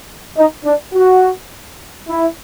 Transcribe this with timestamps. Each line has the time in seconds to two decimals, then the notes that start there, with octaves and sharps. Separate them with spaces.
0.36 D#4
0.65 D4
0.94 F#4
2.08 E4